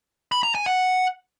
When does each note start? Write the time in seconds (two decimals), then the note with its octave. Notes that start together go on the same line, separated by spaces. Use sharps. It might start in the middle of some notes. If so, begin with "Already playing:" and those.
0.32 B5
0.43 A#5
0.55 G#5
0.66 F#5